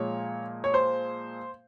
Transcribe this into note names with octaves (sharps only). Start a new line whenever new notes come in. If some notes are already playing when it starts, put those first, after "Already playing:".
Already playing: A#2 F3 G#3 C#5
C#5
C5